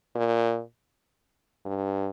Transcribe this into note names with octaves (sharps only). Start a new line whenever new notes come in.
A#2
G2